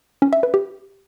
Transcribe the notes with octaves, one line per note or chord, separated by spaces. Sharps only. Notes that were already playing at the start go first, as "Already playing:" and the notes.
C#4
E5
B4
G4